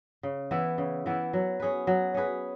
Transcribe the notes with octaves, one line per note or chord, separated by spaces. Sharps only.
C#3
E3 B3 E4
C#3
E3 B3 E4
F#3
C#4 G#4 B4
F#3
C#4 G#4 B4